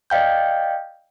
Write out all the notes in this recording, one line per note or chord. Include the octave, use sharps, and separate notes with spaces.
D5 D#5 F5 G5 G6